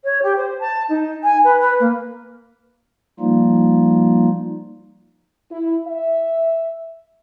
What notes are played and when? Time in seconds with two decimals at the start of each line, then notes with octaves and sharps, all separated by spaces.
0.04 C#5
0.22 G4
0.36 C5
0.59 A5
0.89 D#4
1.23 G#5
1.44 B4
1.60 B4
1.80 A#3
3.20 F3 G3 A#3 D#4 F4
5.51 E4
5.86 E5